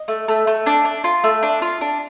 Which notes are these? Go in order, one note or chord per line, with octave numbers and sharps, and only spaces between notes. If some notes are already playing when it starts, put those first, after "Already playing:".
Already playing: D#5
A3
A3
A3
D4
D4
F4
A3
D4
F4
D4